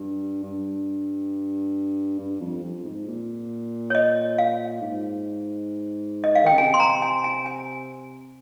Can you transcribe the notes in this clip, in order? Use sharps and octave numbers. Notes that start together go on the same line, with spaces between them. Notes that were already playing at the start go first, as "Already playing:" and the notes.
Already playing: G2
G2
G2
F2
F2
G#2
A#2
C#5
D#5
F5
G#2
D#5
F5
D#3
G5
C#3
C3 G#5
C6
A#5
G#5
G#5
G#5